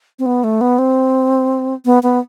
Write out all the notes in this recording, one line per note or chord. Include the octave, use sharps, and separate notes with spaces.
C4
B3
A3
B3
C4
B3
B3